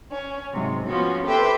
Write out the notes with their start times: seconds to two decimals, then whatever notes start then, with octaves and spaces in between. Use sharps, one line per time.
0.11 C#4
0.53 G#2 C3 F#3
0.86 F3 B3 C#4 F#4
1.26 G4 A4 B4 C5 E5 G5